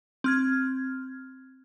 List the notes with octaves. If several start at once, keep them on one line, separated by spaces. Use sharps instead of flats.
C4 F6 G#6